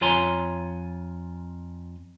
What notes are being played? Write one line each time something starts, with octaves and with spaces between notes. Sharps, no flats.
F2 F4 C#5 G#5 A#5 C6